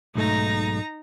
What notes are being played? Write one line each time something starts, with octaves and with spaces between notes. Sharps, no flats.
B1 G#2 A3 D#4 A#5